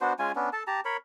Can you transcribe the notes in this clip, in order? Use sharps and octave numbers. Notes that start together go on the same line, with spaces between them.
B3 D4 F#4 C5
G#3 C#4 F4 G#5
B3 C#4 D4
A4 A5
G4 A5 A#5
A#4 C#5 B5